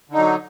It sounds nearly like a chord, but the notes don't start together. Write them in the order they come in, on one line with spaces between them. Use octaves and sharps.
D3 D#4 F#3